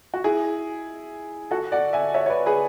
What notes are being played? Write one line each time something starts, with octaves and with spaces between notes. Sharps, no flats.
F#4
E4 G#4
F#4 A4
D5 F#5
E5 G#5
C#5 E5
C#5
B4 D5
G#4 B4